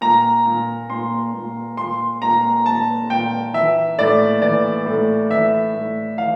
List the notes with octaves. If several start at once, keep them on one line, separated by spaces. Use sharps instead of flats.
A#2 A#5
A#2
A#2 C6
A#2
A#2 C6
A#2 A#5
A#2 A5
A#2 G5
E3 E5
A2 D5
E3 D5
A2
E3 E5
A2
E3 F5